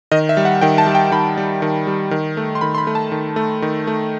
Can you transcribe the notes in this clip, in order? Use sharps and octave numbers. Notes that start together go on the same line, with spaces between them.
D#3 D#5
E5
G3
F#5
D#3 G5
A5
G3
G5
D#3 B5
G3
D#3
G3
D#3
A3
C6
D#3 B5
C6
B5
A3
A5
D#3
A3
D#3
A3